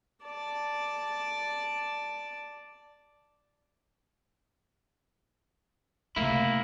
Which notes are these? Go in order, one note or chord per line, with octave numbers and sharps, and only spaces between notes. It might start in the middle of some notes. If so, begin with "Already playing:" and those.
D5 A5
C3 A3 A#3 E4